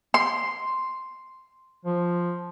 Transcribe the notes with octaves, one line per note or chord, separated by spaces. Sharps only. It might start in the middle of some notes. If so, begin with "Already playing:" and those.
C6
F3